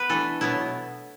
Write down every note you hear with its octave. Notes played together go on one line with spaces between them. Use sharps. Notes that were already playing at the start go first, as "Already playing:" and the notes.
Already playing: B3 B4
E3 A3 D4 A4
B2 F#3 B3 D4 E4